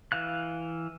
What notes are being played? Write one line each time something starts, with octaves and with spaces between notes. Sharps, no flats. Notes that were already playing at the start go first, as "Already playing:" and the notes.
E3 F5 F#6